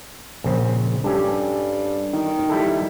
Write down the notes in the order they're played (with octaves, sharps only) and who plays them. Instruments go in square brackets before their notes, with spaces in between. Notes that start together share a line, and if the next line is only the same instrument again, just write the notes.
[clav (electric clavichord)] A#1 C#3 C4
[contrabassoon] G2 [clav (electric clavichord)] C#4 G4 A4
[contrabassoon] D#3
[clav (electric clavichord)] G3 E4 A4